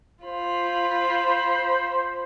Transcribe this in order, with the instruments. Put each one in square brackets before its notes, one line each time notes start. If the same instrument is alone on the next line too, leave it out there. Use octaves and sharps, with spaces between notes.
[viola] F4 B5 [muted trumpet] C5